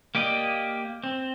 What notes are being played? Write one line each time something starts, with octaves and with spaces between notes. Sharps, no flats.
A#3 G4 D5 D#5
C4